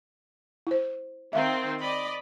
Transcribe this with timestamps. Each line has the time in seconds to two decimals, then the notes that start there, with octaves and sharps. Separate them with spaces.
0.67 E4 C5
1.33 D#3 C4 E5 F5 A#5
1.80 D5 D#5 B5